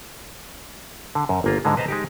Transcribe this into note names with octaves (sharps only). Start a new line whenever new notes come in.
D3
F#2
G1 A#3 F4
G#2 D3 G#3
B4 C5 D#5 A5 A#5
G#3 D#4 G4